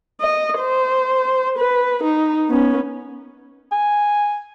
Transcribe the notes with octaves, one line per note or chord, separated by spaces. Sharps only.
D#5
C5
B4
D#4
B3 C#4
G#5